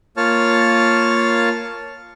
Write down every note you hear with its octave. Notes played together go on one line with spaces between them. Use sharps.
A#3 F4 C#5 A5 F6